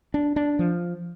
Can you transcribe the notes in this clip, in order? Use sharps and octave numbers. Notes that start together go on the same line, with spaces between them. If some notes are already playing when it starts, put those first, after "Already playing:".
D4
D4
F3